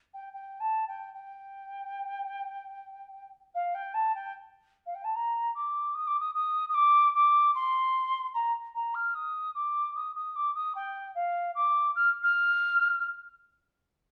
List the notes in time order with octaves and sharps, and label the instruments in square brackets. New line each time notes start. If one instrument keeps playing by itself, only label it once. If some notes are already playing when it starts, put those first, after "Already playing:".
[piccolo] G5
G5
A5
G5
G5
F5
G5
A5
G5
F5
G5
A5
A#5
D6
D#6
D6
D#6
D#6
D#6
D6
D6
C6
A#5
A#5
F6
D#6
D6
D#6
D#6
D6
D#6
G5
F5
D6
F6
F6